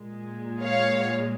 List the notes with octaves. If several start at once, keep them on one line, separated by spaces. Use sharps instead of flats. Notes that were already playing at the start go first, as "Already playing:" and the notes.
Already playing: A#2 G#3
C#5 F5